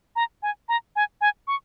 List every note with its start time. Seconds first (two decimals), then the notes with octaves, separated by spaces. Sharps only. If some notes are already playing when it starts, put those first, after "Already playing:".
0.16 A#5
0.43 G#5
0.69 A#5
0.96 G#5
1.21 G#5
1.48 C#6